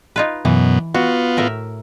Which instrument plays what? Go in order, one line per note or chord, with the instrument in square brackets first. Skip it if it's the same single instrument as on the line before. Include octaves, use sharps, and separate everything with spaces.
[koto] D#4 F4 B4
[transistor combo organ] F#2 B2 [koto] E3
[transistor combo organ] B3 F4 [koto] F#4
[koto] A2 A#4 E5